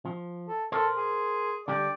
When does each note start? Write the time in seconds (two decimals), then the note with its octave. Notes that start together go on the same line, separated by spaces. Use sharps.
0.06 F3
0.48 A4
0.72 A4 A#4 C5
0.97 G#4
1.68 D3 G3 G4 D5